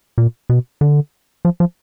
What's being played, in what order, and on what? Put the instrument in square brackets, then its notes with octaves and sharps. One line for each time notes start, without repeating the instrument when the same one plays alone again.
[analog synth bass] A#2
B2
D3
F3
F3